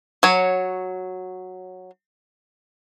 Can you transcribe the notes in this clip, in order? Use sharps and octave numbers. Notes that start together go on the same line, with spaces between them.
F#3 C#5